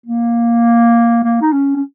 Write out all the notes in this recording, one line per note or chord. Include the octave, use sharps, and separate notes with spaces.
A#3
A#3
D#4
C#4
C#4